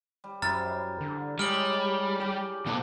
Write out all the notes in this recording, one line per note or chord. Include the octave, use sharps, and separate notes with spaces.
G3
F#2 E4 C5 A#5 F6 A6
D3
G3 G#3 G#4 C#5 G5 F6 D7 F#7
G4 D5 G5 G#5
B2 D3 F3 A#3 D4 G5